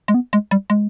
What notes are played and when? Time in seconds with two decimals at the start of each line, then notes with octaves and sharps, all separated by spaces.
0.08 G#3
0.14 B3
0.33 G#3
0.51 G3
0.70 G#3